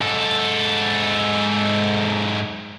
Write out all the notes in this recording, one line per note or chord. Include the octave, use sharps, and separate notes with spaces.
G#2 A4